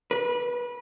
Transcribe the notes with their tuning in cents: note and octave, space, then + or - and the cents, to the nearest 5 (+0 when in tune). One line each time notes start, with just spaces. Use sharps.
B4 -25